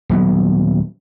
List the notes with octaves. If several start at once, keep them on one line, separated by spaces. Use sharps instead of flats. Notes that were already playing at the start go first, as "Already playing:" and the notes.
D#1 F#3 B3